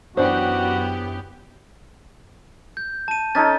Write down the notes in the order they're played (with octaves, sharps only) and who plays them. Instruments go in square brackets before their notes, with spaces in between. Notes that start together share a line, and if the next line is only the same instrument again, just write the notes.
[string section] F#2 B3 G4 [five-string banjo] E3 D4 C5 [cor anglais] F#4
[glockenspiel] G6
A5 D#7
[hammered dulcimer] C#4 D#4 A4 [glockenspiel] A6